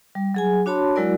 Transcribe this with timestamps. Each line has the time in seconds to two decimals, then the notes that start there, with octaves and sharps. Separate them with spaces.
0.15 G3
0.34 F#3 G#4 G#5
0.66 D4 F#4 C#5 A5 B5 C6
0.96 F#3 G#3 E4 F#4 A#4 D5